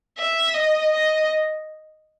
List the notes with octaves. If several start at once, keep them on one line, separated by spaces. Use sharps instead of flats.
E5
D#5
D#5